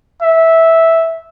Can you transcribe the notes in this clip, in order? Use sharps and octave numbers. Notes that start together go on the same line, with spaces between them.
E5